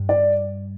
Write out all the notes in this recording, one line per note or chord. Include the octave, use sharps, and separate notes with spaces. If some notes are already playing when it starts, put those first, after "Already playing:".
Already playing: G2
D5